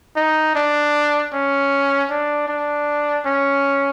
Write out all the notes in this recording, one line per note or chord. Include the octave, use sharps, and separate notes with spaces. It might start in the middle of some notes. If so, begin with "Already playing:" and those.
D#4
D4
C#4
D4
D4
C#4